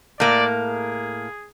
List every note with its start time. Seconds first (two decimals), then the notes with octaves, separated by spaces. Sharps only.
0.20 A2 A#3 D5
0.60 G#4